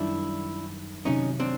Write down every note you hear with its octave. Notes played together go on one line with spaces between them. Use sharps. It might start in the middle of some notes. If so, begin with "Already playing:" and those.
Already playing: F#2 D#3 G3 D4 E4
C3 D#3 F#3 C#4 D#4
C4 D4